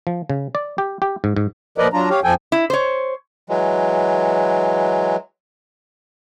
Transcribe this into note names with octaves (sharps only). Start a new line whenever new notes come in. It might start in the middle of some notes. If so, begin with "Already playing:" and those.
F3
C#3
D5
G4
G4
G#2
G#2
A#2 F3 A#4 B4 D5 D#5
F#3 D4 F4 A#5
G4 C#5 F5
F2 F3 A4 G5 G#5
E4
C5 C#5
E3 F#3 G#3